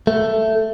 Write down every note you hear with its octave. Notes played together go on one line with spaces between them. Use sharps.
A3